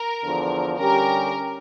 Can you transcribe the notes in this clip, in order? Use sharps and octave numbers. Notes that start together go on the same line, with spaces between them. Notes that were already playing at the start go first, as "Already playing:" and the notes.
Already playing: A#4
E2 D3 F3
D3 G3 C#4 G4 A#4